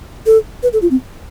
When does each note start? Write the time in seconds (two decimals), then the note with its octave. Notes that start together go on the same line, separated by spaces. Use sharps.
0.26 A4
0.63 B4
0.73 A4
0.82 F4
0.91 C4